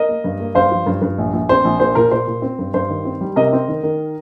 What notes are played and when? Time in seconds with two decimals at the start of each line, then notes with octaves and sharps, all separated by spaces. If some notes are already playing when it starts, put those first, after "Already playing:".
Already playing: A#4 D#5
0.09 A#3
0.24 G2
0.40 A#3
0.55 G2 C5 F5
0.71 F3
0.86 G2
1.02 G2
1.18 A#1
1.33 A#1
1.49 C4 C5
1.65 A#1
1.80 A#2 C5
1.95 A#2 A#4
2.11 A#2 C5
2.27 A#2
2.42 C4
2.59 G2
2.74 G2 C5
2.90 D#3
3.05 C4
3.21 G3
3.36 C3 A#4 D#5
3.52 C4
3.68 D#3
3.83 D#3